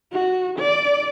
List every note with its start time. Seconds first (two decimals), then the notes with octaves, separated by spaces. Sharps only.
0.12 F#4
0.59 D5